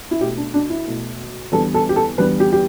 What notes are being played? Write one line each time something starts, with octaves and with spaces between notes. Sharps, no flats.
E4
B2 A3 G4
D4
D4
E4
B2 A3
E2 D3 G3 B3 A4
A4
G4
A4
E2 D3 G3 B3 B4
G4
G4